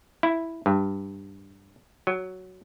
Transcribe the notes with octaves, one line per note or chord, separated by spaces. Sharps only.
E4
G2
F#3